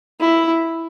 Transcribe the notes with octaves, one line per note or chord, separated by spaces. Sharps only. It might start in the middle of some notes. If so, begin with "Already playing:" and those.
E4